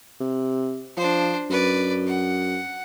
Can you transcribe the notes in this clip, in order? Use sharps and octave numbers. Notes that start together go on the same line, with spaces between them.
C3
F3 D4 C5
F#2 B4 D5
F#5